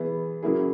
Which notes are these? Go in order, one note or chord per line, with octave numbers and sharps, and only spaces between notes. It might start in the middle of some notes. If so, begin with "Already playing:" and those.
Already playing: E3 B3 E4 G#4
C#3 F#3 A#3 E4 G#4